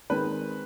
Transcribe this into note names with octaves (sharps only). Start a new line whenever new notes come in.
D#3 G#3 C4 B4